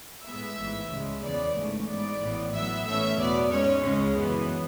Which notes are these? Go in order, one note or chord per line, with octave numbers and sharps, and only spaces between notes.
A2 G#3 B3 E5
A1 G#2 E3
C#2 C#3 G#3
E2 C#3 E3 B3 D5
G#1 G#2 E3 A3 C#4
G#2 G#3 B3 D5
A1 A2 E3 B3
A2 F#3 B3 E5
A2 E3 A3 C#4 E5
E2 B2 F#3 B3 D5
G#2 G#3 C#4 C#5
C#2 C#3 G#3 C#4
F#2 E3 B3